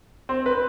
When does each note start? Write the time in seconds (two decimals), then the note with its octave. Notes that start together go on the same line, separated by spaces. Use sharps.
0.29 C4
0.46 B4